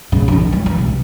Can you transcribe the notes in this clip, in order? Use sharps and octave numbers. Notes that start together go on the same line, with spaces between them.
C#3
D3
D#3
F3
E3
C3